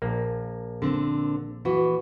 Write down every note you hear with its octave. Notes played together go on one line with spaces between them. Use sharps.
A#1 A#3
D3 C4
E3 F#4